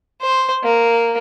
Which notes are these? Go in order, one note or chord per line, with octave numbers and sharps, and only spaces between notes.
C5
A#3